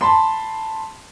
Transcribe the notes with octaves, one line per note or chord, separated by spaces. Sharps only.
A5 B5 C6